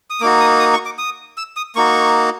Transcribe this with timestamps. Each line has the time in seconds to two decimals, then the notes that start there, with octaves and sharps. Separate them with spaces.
0.10 D#6
0.21 A#3 D#4 F#4 D6
0.40 D#6
0.60 D#6
0.73 C#6
0.85 D6
0.98 D#6
1.37 E6
1.57 D#6
1.76 A#3 D#4 F#4 C#6